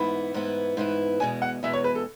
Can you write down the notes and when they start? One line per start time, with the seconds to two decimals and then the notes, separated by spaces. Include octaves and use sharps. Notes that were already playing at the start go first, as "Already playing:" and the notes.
Already playing: G#2 E3 B3 E4 B5
0.34 G#2 E3 B3 E4
0.77 G#2 E3 B3 E4
1.20 E2 B2 G#3 G#5
1.42 F#5
1.63 E2 B2 G#3 E5
1.73 C#5
1.84 B4
1.95 A4